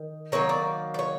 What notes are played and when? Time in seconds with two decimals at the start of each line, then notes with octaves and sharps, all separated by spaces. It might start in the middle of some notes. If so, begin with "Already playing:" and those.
Already playing: D#3
0.32 D#3 F#3 A#3 C#5
0.49 D5
0.94 D5
0.99 C#5